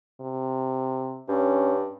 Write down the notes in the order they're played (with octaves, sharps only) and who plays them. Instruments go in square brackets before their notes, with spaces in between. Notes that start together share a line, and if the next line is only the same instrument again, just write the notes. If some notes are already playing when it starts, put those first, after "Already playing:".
[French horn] C3
[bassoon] G2 [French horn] C#4